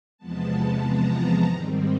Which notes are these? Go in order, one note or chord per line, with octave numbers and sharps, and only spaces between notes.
E2 C3 F3 G#3 B3 A5
A#5
G#2 D#3 G3 C4 A#5